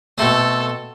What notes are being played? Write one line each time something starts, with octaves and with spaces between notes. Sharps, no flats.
B2 A3 C4 A4